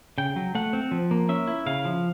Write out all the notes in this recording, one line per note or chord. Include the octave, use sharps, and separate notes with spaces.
C#3 G5
F#3
A3 F#5
C4
F3
A#3
C#4 E5
E4
C#3 F5
F3